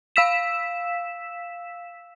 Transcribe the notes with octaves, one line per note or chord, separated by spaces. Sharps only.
F5 E6 B6 E7